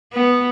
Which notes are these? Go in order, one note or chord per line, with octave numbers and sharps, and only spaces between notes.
B3